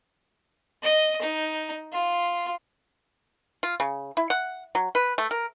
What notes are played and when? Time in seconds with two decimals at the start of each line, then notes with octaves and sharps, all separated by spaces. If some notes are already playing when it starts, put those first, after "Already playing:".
0.83 D#5
1.22 D#4
1.92 F4
3.63 F4
3.80 C#3
4.17 E4
4.30 F#5
4.75 F#3
4.95 B4
5.18 A3
5.31 A#4